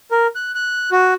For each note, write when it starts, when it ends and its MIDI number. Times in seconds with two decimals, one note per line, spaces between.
0.11 0.27 70
0.36 0.51 90
0.55 0.90 90
0.92 1.14 66